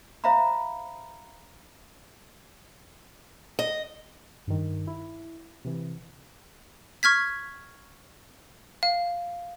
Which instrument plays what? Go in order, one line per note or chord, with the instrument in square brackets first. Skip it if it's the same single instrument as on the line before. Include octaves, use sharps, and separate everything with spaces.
[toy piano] C5 E5 F5 A#5 B5
[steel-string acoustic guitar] D#5
[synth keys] G2 D#3
E4
C3 E3
[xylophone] C#6 F6 G#6 B6
F5